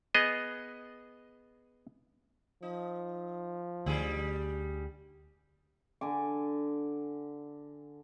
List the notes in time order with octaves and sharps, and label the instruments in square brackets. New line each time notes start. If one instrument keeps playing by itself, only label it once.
[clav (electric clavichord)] B3 G#4 D#5
[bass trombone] F3 [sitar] D#4
[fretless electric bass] D2 [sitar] D3 G3 G#4
[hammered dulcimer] D3 G#5 D6